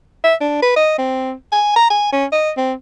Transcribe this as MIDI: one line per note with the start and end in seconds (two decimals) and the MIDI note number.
0.24 0.34 76
0.41 0.60 62
0.62 0.74 71
0.76 0.94 75
0.98 1.33 60
1.52 1.73 80
1.76 1.88 82
1.90 2.09 80
2.12 2.25 61
2.32 2.51 75
2.57 2.73 60